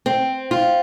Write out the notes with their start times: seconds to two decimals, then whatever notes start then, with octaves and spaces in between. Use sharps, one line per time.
0.06 C4
0.51 F4